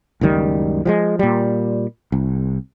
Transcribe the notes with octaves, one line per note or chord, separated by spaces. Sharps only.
F#1 C#2 D#3 G3
F3 G3 G#3
A#2 G3
C2